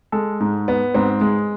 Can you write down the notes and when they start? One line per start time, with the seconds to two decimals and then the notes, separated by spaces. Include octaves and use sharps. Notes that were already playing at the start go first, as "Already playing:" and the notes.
0.12 G#3 A4
0.40 G#2
0.68 B3
0.95 G#2 C4
1.21 G#3